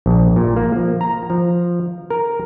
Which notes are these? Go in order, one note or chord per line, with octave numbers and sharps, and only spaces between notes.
A#1
A#2
A#3
F3
A#5
F3
A#4